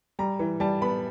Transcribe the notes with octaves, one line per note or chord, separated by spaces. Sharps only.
G3 A#5
E3
G3 A5
B3 B5